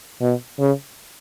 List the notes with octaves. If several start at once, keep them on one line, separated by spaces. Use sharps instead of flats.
B2
C#3